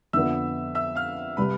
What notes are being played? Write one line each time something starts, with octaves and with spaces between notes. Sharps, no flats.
F2 D3 F3 B3 E5 E6
E5 E6
F5 F6
C3 G3 B4 B5